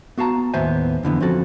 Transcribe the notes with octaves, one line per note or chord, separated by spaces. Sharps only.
B3 F#4 F5 A5 A#5
D#2 A2 B3 C5 E5 G#5
F2 D3 E3 B3
F3 C4 C#4 F#4 A4